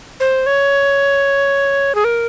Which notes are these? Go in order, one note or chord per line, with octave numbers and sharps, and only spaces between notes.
C5
C#5
G#4
A#4